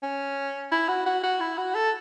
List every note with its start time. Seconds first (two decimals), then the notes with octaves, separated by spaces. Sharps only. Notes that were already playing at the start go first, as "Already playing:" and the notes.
0.03 C#4
0.72 E4
0.89 F#4
1.06 F#4
1.23 F#4
1.41 E4
1.58 F#4
1.75 A4